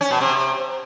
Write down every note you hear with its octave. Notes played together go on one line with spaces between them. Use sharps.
C#4
B2
C3